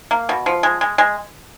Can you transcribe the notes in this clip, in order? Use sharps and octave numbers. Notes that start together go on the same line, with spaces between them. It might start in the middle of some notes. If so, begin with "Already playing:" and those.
A#3
B2
F3
G#3
G#3
G#3